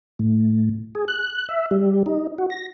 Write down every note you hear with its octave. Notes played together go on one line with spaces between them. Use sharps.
A2
G#4
F#6
E5
G3
D#4
F#4
A#6